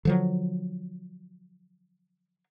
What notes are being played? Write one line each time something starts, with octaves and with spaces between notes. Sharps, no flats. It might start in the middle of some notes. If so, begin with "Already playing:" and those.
D3 F3 F#3